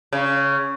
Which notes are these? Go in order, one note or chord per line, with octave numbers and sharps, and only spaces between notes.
C#3